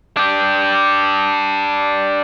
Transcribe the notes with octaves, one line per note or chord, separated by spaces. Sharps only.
D4 G4